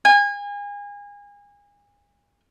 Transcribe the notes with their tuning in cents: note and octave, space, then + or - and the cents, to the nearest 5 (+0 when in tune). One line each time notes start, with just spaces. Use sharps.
G#5 -30